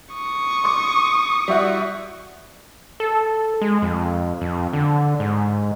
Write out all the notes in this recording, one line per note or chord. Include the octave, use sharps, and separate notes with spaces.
C#6 D#6
C6 D6
G3 E4 F#4
A4
G#3
F2
F2
D3
G#2